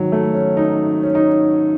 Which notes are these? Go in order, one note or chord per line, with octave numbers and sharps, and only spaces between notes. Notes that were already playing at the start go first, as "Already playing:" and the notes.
Already playing: G#1 G#2 D#3 F#3
A3
C#4
D#4
C#4
D#4